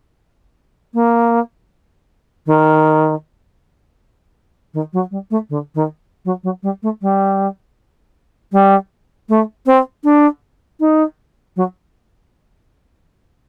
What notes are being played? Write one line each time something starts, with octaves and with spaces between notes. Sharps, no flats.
A#3
D#3
D#3
F#3
G3
A3
D3
D#3
F#3
F#3
G3
A3
G3
G3
A3
C4
D4
D#4
F#3